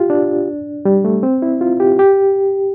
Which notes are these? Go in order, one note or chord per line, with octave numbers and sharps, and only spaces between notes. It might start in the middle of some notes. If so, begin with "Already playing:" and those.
Already playing: F4 G4
D4
G3
A3
C4
E4
F4
G4
G4